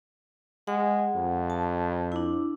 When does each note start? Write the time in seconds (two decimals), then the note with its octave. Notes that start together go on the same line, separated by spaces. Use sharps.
0.67 G#3 F#5
1.15 F2
1.50 A5
2.12 D4 E4